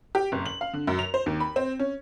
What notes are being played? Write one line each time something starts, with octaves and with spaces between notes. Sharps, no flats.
G4
F#1
F#7
F5
D3
F#2
F7
C5
D#2
B5
C4
C#4